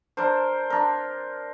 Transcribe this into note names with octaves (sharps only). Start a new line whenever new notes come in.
D4 A#4 C5
D4 A#4